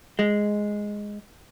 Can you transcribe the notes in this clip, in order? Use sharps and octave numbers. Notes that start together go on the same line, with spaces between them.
G#3